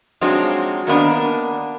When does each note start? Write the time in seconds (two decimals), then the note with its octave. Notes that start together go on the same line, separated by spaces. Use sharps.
0.21 F3 F#3 G#3 C4 D4 D#4
0.87 D#3 A#3 B3 D4